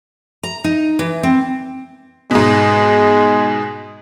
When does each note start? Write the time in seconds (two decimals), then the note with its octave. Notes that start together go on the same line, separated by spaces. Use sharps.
0.43 A#5
0.64 D#4
0.99 E3
1.23 C4
2.31 G#2 B2 G#3